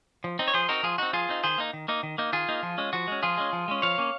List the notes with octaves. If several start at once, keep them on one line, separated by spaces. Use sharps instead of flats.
F3
C4 D#4
C#5
F3 G#4 C5
C4 D#4 F#4 A#4
F3 F4 G#4
C4 D#4 F#4
F3 F4 G#4
C4 D#4
D#3 G#4 C5
A#3 D#4
D#3
A#3 D#4
D#3
A#3 D#4
D#3 F4 G#4
A#3 D#4
F3
G#3 C#4
F3 F#4
G#3 C#4
F3 F4 G#4
G#3 C#4
F3
G#3 C#4
F3 C#5 F5
A#3 C#4